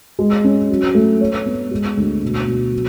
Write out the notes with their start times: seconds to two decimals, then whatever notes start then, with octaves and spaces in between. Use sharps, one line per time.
0.19 G#3
0.44 C#4
0.70 F#3
0.95 A3
1.21 C#5
1.46 B3
1.71 G#3
1.97 D2
2.22 B2
2.47 B2
2.73 F#3